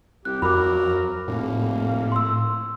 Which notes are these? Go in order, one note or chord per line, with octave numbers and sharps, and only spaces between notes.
C2 G4 F#6
F2 F#3 A#4 B5 D6
F1 A2 A#3
C6 E6